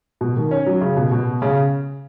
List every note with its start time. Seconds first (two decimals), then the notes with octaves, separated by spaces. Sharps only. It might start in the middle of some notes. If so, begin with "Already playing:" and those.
0.21 B2
0.36 D#3
0.51 C#4
0.66 F#3
0.81 C#3
0.96 B2
1.11 B2
1.42 C#3